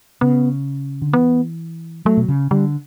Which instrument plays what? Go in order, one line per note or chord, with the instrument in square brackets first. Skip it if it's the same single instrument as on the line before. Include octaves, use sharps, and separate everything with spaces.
[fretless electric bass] C#3 [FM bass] B3
[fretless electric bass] D3
[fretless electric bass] E3 [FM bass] B3
[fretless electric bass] F#3 [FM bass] A3
[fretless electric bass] B2
C#3
[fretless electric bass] D3 [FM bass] G3